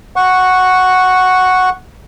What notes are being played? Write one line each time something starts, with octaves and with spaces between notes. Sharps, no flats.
F#5 C#6